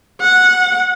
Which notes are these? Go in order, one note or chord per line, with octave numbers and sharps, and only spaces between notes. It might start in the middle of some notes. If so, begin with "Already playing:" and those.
F#5